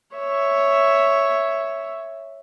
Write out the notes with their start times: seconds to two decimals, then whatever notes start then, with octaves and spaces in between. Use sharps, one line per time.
0.16 C#5 E5